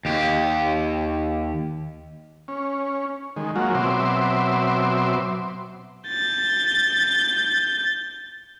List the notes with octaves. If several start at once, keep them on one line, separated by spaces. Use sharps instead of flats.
D#2 G4
C#4
D#3 G#3
F#3 G#3 A#3 F4 F#4
B2 F#3 C4 E5 C6 D6
G6 A6